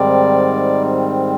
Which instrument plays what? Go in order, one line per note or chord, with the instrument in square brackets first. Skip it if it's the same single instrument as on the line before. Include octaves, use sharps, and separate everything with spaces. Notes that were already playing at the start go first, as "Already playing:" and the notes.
Already playing: [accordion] G#2 D#3 G3 C4 D5